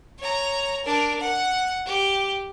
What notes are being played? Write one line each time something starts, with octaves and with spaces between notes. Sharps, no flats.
C#5 A#5
D4 A#4
F#5
G4